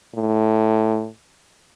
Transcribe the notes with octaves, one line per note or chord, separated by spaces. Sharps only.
A2